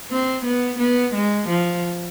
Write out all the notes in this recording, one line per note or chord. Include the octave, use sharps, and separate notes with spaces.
C4
B3
B3
G#3
F3